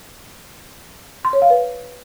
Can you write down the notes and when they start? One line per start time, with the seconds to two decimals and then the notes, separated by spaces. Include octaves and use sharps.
1.25 C6
1.33 C#5
1.42 F5
1.50 B4